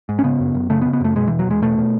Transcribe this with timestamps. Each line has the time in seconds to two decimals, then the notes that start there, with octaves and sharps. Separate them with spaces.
0.09 G#2
0.19 C#4
0.24 C#3 B3
0.40 F#2
0.54 F#2
0.70 C#3 A3
0.81 B3
0.85 C#3
0.93 B3
1.01 F#2 A3
1.16 B2 G#3
1.27 E2 E3
1.39 F#3
1.47 E2 G#3
1.62 B2 A3
1.78 B2